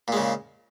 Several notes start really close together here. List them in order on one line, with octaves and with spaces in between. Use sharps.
A#2 G#3 C#3